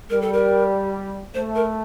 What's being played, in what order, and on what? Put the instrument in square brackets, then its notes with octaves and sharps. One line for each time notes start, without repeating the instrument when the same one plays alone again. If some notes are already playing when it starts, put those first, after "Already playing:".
[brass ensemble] G3 [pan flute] A#4
[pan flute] A4
A#4
[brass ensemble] A3 [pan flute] C5
[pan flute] A#4